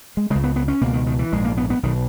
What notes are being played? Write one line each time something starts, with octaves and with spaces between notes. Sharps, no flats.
G#3
C#2 C#3 G#3
B3
B3
C#4
C#2 B2 A#3
D#3
D#3
E3
A#1 G#2 G#3
A#3
B3
B3
B1 B2 D#3